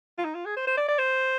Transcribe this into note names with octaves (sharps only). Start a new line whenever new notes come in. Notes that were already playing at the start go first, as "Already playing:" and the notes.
F4
D#4
F4
G#4
C5
C5
D5
D5
C5